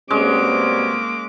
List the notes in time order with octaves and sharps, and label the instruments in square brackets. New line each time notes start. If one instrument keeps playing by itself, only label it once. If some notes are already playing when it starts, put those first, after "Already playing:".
[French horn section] B2 G3 C4 [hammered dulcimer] G#3 C#4 [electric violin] A#3 D6